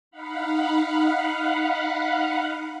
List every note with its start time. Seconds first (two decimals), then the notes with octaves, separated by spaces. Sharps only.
0.11 D#4 F5 F#5 B5